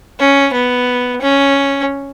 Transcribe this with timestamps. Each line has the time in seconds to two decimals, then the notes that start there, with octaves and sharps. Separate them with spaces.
0.19 C#4
0.53 B3
1.21 C#4